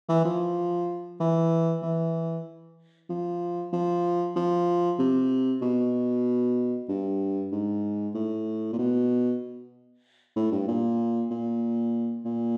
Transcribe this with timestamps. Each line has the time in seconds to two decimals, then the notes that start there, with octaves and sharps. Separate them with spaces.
0.09 E3
0.25 F3
1.20 E3
1.82 E3
3.09 F3
3.73 F3
4.36 F3
4.99 C3
5.62 B2
6.89 G2
7.52 G#2
8.15 A2
8.73 A#2
8.78 B2
10.36 A2
10.52 G2
10.68 A#2
11.31 A#2
12.25 A#2